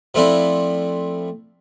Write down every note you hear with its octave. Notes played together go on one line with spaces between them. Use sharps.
F3 A3 C4 D4 E4